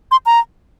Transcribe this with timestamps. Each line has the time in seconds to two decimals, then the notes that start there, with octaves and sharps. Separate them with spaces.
0.11 C6
0.26 A#5